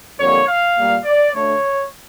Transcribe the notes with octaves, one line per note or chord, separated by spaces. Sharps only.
F2 D3 G3 A#3 C#5
F5
A#2 G3 A#3
D5
D2 D3 A3 C#5